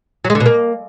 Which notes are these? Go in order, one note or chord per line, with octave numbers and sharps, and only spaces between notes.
F#3
G#3
D3
B2
A#3